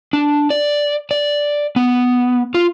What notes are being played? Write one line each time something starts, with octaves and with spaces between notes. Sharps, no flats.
D4
D5
D5
B3
F4